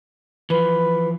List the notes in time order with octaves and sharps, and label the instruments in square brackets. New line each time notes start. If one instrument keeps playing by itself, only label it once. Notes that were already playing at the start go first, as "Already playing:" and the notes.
[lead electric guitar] E3 F3 [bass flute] B4